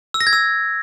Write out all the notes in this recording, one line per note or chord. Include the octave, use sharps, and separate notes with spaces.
E6
A#6
G#6
E6